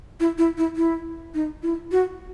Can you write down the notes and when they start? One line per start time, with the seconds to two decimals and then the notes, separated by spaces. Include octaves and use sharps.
0.20 E4
0.38 E4
0.58 E4
0.76 E4
1.34 D#4
1.63 E4
1.92 F#4